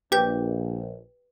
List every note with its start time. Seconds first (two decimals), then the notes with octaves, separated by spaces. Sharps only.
0.12 A#1 G4 B4 G6